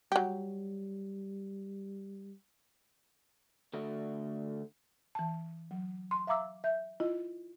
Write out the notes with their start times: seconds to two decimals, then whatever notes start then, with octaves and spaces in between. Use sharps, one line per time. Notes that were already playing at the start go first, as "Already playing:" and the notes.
0.12 F#3 G3 G4
3.74 D3 A3 F#4
5.15 E3 A5
5.71 F#3
6.11 C6
6.27 E5 F5 A#5 D6 E6
6.64 E5 G6
7.00 E4 F4 D#5